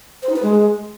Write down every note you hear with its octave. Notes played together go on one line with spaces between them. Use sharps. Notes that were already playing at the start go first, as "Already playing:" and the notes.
C5
D#4
B4
G#3